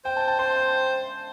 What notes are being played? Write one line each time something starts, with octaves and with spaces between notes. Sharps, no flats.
C5 G5
A5
A5
C5 C6
C6